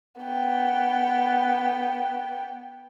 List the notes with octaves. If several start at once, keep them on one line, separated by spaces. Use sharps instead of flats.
B3 G5